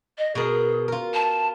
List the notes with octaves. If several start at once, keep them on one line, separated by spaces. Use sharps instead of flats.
D#5
B2 G#4 A#4
F4 A#4
A5